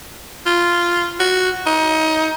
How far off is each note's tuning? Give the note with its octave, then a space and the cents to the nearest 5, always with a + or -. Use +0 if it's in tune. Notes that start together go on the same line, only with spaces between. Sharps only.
F4 -5
F#4 +0
D#4 +25